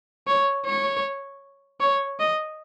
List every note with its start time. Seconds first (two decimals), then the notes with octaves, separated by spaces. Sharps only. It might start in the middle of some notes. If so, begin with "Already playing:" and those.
0.27 C#5
0.65 C#5
1.80 C#5
2.20 D#5